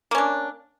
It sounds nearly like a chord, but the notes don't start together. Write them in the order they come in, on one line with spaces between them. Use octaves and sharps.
A#3 C#4 D4